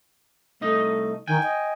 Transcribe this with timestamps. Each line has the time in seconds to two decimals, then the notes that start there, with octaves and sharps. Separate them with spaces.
0.61 C2 A3 D#4 D#5
1.28 D#3 G5 G#5
1.43 D#5